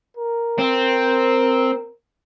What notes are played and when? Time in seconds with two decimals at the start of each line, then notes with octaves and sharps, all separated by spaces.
0.17 A#4
0.59 C4